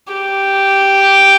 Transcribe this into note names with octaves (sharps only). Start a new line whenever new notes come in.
G4